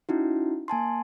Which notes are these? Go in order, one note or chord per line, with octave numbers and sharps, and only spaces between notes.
C#4 D#4 E4 F#4
A#3 G#5 A5 C6